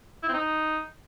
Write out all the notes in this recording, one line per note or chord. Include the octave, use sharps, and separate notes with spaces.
E4
C4
D#4